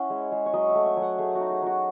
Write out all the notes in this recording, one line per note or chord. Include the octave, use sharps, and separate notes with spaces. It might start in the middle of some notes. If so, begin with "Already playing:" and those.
Already playing: C#4 E4 E5 F#5
G#3
G#3
C#5
F#3 D#5
E5
A3
E5
F#3 G#5
F#5
A3 G#4
F#4
D#4
G#4
F#3 F#4